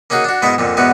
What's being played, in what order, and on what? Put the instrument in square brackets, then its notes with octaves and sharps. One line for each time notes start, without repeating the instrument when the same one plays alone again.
[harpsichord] A#3 C#4 D#4 F#4 G#4
D4 F#4
G#2 B2 G#3 E4 A4 E5
F2 A#2 D3
E2 G#2 D3 B3 F#4